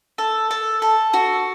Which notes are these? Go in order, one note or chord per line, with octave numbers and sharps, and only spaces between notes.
A4
A4
A4
F#4